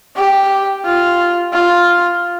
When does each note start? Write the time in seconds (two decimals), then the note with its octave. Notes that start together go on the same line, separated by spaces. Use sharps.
0.16 G4
0.85 F4
1.53 F4